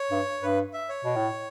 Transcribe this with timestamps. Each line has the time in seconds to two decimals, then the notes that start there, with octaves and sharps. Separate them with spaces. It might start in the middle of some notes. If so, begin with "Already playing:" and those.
Already playing: C#5
0.11 G2
0.42 G2 B4
0.73 E5
0.89 C#5
1.05 B2
1.16 A2